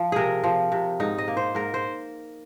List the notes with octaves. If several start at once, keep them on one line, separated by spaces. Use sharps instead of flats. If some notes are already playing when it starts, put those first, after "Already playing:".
Already playing: F3
C3 G#4 A#4
F3
C3
G#2 D#4
D#5
A#3
C5
G#2 A#4
C5